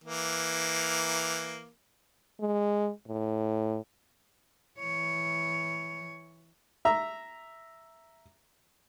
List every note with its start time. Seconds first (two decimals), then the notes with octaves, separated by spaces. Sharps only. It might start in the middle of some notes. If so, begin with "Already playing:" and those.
0.04 E3 A#3
2.40 G#3
3.08 A2
4.79 E3 C#5
6.85 E5 A#5